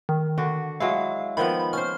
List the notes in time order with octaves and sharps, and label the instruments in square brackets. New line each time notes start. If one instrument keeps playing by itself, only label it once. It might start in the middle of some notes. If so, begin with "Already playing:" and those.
[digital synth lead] D#3
[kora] D3 F#4
[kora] F#3 G#3 E4 [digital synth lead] F5
[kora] D#3 F3 B3 [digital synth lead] B5
[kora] C#4 C5 [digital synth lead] F6